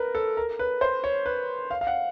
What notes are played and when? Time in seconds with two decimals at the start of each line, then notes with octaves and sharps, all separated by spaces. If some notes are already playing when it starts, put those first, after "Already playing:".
Already playing: A#4 B4
0.15 A4
0.37 A#4
0.59 B4
0.81 C5
1.04 C#5
1.26 B4
1.71 F5
1.81 F5
1.87 F#5